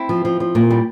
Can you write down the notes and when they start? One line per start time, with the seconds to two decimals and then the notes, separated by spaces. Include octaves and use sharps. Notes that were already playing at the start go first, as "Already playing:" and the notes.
Already playing: C4 E4
0.09 F3
0.25 F3
0.40 F3
0.55 A#2
0.70 G3